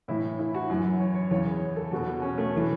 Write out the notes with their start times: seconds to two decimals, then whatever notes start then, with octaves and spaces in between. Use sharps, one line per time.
0.08 A2 E3 E4
0.39 E4
0.55 F#4
0.70 F#2 E3
1.00 C#5
1.15 C#5
1.31 E2 C#3 E3 C#5
1.76 A4
1.92 E2 B2 F#4
2.22 C#4
2.38 A3
2.57 E3